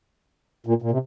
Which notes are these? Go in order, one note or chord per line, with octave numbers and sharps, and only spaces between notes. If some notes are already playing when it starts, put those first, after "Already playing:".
A#2
A#2
C3